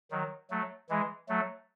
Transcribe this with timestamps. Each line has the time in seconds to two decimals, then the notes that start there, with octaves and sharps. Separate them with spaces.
0.11 D#3 F#3
0.50 F#3 A3
0.89 E3 G#3
1.29 F#3 A3